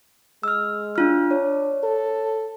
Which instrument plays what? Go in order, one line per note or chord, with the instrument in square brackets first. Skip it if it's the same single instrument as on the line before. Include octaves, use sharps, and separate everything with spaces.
[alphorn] G#3 [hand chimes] E6 F6
[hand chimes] D4 F4 F6
[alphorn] D4 [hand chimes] C#5
[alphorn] A4